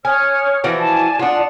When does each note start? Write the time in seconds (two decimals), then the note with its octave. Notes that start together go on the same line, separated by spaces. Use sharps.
0.05 C#5 G#5 D#6 F6
0.64 E3 F3 F#4
0.78 D5 G#5 A5
1.19 D4 F4 F#5 A5 D#6